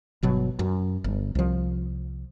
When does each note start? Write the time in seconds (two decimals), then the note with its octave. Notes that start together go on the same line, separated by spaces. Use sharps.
0.23 G1 B2 F#3
0.59 F#2
1.04 G1
1.35 C2 F3